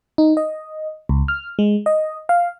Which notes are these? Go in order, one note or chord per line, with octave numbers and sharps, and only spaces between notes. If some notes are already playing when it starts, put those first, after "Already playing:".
D#4
D#5
C#2
F6
G#3
D#5
F5